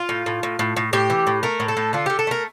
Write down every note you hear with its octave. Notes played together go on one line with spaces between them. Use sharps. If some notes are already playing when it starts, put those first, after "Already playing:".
Already playing: F4
A2
A2
A2
A2
A2
A2 G4
E3
A2
A3 A#4
A2
A4
A2
D3 F4
D3 G4
A4
A3 A#4